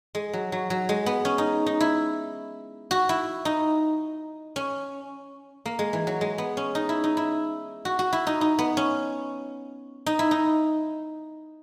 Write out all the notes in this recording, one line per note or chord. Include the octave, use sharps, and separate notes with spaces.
G#3
F#3
F#3
F#3
G#3
B3
C#4
D#4
D#4
E4
F#4
E4
D#4
C#4
A#3
G#3
E3
F#3
G#3
B3
C#4
D#4
E4
D#4
E4
F#4
F#4
E4
D#4
D#4
B3
C#4
D#4
E4
D#4